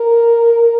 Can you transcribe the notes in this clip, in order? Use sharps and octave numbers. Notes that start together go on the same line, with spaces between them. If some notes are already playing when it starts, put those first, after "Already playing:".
Already playing: A#4